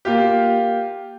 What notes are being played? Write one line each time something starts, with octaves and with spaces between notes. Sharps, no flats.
A#3 F4 G4